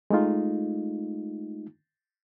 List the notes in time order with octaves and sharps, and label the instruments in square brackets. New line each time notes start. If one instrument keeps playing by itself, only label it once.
[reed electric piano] G#3 A3 D#4 F4